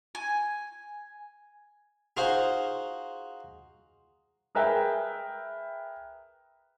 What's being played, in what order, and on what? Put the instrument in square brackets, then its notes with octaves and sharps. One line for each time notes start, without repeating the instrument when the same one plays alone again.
[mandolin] G#5
[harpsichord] D#4 F4 F#4 G#4 C5
[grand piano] G#4 A#4 B4 E5 G5